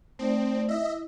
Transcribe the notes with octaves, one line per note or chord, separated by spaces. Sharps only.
A3 C4 D#4 D5
E4 D#5 E5